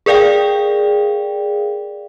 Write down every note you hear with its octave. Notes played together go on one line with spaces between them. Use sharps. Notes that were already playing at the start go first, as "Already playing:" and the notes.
G#4 A#4 D5 F5 G5